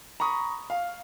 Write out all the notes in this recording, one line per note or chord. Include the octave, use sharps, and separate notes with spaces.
A#5 B5 C#6 D#6
F5